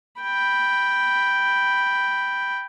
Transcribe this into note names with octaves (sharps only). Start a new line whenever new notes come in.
G5 B5